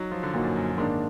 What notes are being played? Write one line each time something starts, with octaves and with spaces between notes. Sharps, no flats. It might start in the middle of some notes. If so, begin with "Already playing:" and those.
Already playing: F#3 D#4
F3
D3
A#2 F#3 A#3 D#4 F#4
F#2
F#2
G#2 D#3 A#3 D4